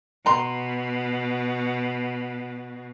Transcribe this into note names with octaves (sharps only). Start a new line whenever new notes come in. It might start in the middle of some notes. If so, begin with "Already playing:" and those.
B2 A#5 C6